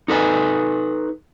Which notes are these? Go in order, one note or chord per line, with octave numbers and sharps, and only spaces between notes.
D#4 A4 B4 G#5